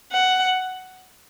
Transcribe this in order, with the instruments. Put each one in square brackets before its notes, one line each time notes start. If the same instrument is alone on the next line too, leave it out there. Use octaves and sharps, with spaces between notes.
[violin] F#5